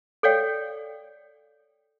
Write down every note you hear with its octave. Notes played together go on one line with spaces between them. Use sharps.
A4 C#5 D5 F5 G5